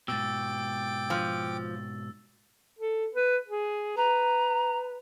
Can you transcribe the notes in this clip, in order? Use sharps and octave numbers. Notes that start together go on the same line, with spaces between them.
G#2 B2 G5 D6 E6 A6
F3
A4
B4
G#4
B4 A#5